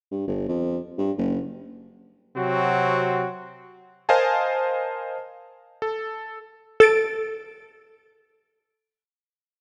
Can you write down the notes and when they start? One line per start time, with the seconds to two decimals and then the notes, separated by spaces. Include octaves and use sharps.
0.11 G2
0.27 G1
0.48 F2
0.98 G2
1.18 F#1
2.37 C3 F#3 C4 F#4
4.09 A#4 C5 D#5 F5 G#5 A5
5.82 A4
6.80 A4 A6 D7